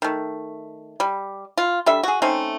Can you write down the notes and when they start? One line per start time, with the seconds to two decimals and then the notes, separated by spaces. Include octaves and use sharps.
0.02 D#3 A3
1.00 G3
1.57 F4
1.86 G3 D4 A4 E5
2.03 F#4 G#4
2.22 A3 C4 C#4 D#4